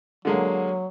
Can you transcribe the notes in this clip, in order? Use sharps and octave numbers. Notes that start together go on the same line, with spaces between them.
D3 F#3 G#3 A#3